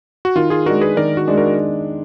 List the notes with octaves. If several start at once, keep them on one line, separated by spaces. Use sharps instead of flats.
F#4
D#3 F4
F4 G#4
G#3 D4 F#4 A#4
G#4 B4
D#3 A#4 D5
F#4
G#3 D4
F#4 A#4